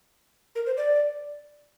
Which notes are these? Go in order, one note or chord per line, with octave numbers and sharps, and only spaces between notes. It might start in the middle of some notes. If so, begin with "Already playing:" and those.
A#4
C5
D5